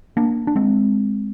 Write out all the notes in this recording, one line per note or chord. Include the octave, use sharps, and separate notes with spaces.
A#3 D4
D4
G#3 C4